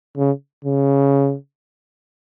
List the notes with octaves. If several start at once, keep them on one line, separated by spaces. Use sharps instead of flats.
C#3
C#3